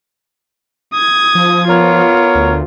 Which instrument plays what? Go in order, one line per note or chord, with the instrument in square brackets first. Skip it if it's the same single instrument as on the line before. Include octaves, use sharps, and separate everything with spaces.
[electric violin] D#6 G#6
[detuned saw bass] F3
[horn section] B3 A#4 C#5 [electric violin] F4
[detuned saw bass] D2